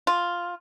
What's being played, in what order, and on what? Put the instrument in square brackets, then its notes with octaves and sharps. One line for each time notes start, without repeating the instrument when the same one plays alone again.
[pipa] F4